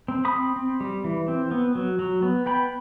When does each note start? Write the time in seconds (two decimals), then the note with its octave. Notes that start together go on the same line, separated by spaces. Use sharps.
0.08 C4
0.25 B5 D#6
0.33 C4
0.56 C4
0.80 G3
1.04 E3
1.28 C4
1.51 B3
1.75 F#3
1.99 F#3
2.22 B3
2.46 B3 G5 B5